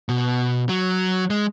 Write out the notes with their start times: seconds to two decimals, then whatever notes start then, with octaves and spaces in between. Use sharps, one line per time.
0.09 B2
0.69 F#3
1.30 G#3